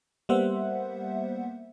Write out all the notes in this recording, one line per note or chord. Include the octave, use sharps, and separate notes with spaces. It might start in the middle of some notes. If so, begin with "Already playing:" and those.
G3 A#3 B3 C5 E5 F#5